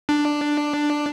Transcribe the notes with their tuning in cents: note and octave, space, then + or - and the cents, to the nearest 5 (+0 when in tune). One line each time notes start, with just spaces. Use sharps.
D4 +5